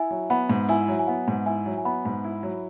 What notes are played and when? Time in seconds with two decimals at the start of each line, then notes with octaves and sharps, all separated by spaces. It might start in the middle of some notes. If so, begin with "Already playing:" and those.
Already playing: E4 E5 G#5
0.11 F#3
0.30 B3 F#5 B5
0.50 G#2
0.69 E4 E5 G#5
0.88 F#3
0.99 G#5
1.07 B3 F#5
1.28 G#2
1.46 E4 E5 G#5
1.66 F#3
1.78 G#5
1.85 B3 F#5 B5
2.05 G#2
2.24 E4
2.43 F#3